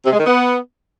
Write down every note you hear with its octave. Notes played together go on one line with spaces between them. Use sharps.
C3
G#3
D#3
B3